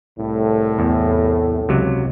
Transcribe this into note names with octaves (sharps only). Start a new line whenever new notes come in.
C2 A2
E2
C#2 C3 F#3